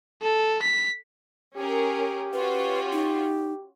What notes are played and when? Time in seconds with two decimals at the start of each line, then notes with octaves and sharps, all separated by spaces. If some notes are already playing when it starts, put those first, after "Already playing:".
0.22 A4
0.62 B6
1.56 C#4 G4 G#4 A#4
2.33 C#4 F4 F#4 B4
2.92 D#4